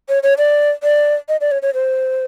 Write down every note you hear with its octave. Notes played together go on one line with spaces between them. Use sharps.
C#5
C#5
D5
D5
D#5
D5
C#5
C#5
C5